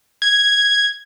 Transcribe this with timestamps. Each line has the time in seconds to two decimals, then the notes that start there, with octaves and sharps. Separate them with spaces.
0.22 G#6